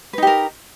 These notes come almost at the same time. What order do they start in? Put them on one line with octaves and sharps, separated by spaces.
B4 D#4 G4 A#4